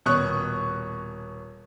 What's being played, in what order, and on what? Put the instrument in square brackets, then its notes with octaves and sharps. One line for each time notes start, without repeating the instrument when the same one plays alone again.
[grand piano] D#1 B2 C#5 C#6 D#6 F#6